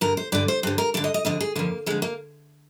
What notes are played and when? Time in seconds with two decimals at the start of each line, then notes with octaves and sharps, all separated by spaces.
0.01 G2 D3 A#4
0.17 C5
0.32 G2 D3 D5
0.48 C5
0.63 G2 D3 C5
0.78 A#4
0.94 G2 D3 D5
1.04 D#5
1.14 D#5
1.25 F2 D3 D#5
1.40 G#4
1.55 F2 D3 A#3
1.86 F2 D3 G#3
2.02 A#3